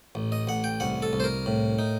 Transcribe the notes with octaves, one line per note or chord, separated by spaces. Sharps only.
A1
D#5
A1 F#5
G5
C2 F#5
A4
C2
C5
A#4
A2
D#4